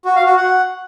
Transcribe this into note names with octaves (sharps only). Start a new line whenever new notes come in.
F#4
F5
F#4
F#5